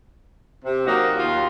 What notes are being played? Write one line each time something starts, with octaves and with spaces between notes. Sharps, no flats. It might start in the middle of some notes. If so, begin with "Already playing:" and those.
C3
F#3 A#3 D#4 F#4 G4
D#2 F4